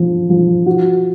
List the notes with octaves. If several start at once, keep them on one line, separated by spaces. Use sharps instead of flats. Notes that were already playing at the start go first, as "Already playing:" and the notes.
Already playing: F3
F3
F#4